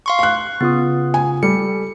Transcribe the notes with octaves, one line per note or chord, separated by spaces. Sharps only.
F5 C6 C#6
F5 C#6 F#6
C#3 B3 F4 D#6
G#5
G3 A4 C#7